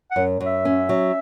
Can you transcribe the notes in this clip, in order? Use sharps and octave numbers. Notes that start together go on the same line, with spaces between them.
F#2 F#5
F#2
E5
C#4
F#3